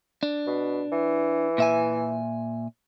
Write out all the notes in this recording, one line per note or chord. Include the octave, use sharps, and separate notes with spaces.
D4
B2
E3
A#2 E5 G#5